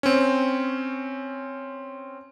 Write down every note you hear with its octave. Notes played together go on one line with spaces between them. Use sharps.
C4 C#4